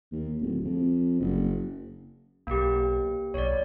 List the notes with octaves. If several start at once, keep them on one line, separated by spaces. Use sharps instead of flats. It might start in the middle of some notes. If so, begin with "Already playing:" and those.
D#2
D1
F2
F#1
B1 A#3 G4
B1 C#5 D5